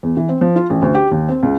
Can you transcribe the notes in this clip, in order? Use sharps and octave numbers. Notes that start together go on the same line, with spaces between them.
E2
E3
C4
F3
F4
A1
D2
G4
D#2
C4
C#2